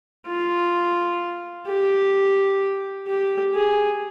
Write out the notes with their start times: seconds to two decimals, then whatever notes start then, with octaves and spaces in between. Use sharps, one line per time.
0.27 F4
1.67 G4
3.07 G4
3.54 G#4